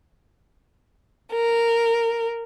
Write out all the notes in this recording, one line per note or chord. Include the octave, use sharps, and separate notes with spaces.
A#4